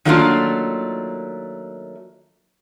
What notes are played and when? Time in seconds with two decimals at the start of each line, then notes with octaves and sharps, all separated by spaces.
0.05 D#3 F#3 A3 A#3 D4 F4